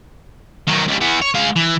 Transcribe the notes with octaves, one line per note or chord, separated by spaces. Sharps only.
D#3 F#3
C#2 G3
E3 B3
C#5
G#3 F5
E3